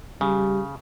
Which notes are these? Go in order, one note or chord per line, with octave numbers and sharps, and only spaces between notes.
C#3 G3